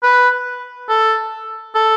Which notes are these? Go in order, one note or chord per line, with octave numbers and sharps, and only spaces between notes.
B4
A4
A4